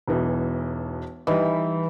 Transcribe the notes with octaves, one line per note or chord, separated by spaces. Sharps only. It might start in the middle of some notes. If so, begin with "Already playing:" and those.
E1 B1 E3
E3 G3 D#4